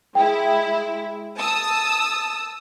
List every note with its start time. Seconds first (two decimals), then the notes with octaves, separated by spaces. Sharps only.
0.15 G#3 E4 G5
1.36 A5 D#6 E6